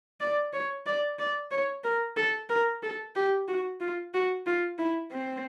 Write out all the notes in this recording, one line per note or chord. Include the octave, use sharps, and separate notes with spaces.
D5
C#5
D5
D5
C#5
A#4
A4
A#4
A4
G4
F#4
F4
F#4
F4
E4
C4